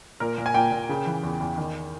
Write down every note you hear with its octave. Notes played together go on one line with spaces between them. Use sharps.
A#2 A#4
A#2
G#5
A#2 G5
A#2
C#3
E3
E2
E2
D#3